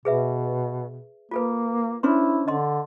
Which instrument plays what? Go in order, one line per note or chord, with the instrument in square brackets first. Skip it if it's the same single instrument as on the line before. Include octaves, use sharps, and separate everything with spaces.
[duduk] B2 [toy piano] G#4 B4 E5
[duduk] A#3 [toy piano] F4 A4 B4
[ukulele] C#4 D4 C5 [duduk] E4 [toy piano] C6
[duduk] D3 [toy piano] D#5 C6